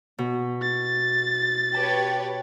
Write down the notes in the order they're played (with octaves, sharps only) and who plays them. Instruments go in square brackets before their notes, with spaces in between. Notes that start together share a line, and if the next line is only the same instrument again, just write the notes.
[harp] B2
[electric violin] A6
[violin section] G4 B4 C#5 [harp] A5